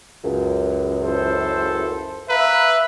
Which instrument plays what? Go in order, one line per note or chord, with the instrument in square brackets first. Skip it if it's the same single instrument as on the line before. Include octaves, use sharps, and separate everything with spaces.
[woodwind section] C#2 F#2
[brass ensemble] E4 A4 C5
[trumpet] B4 [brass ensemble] E5 [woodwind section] F5 A#5